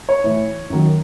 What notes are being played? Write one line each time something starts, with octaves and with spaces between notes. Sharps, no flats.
C#5
A2 E3
F#2 D#3 F#3